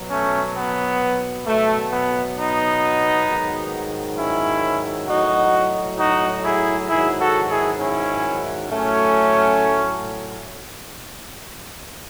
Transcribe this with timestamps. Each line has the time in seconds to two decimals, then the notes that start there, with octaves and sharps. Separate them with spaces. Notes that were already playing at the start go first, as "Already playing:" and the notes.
Already playing: B2 F#3
0.10 A3 C#4
0.56 B3
1.46 B2 F#3 A3
1.91 B3
2.37 B3 D#4
3.26 G#2 D#3 F#3
4.17 C#4 E4
5.07 A2 F#3 D#4 F#4
5.98 D#4 F#4
6.43 E4 G#4
6.88 G#2 D#3 F#3 E4 G#4
7.19 F#4 A4
7.48 E4 G#4
7.78 C#4 E4
8.69 A2 F#3 A3 C#4